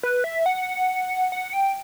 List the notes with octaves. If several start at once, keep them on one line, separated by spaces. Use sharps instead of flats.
B4
E5
F#5
F#5
G5